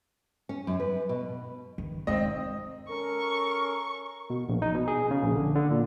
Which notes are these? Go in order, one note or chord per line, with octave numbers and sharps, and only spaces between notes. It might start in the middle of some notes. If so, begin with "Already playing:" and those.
C#4
F#2
B4
B2
D#3
G#3 C4 D#4 D#5
C#4 A4 A#4 C#6
B2
A#1
D#4
B2
G#4
C#3
A#1
D3
D3
A#2